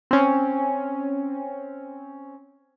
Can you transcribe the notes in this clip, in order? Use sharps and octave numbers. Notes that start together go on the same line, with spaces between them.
C4 C#4